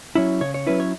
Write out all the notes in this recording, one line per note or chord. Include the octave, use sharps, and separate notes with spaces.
F#3 C#4 E4
C#3 C#5
C#5
F#3 C#4 E4 B4
C#5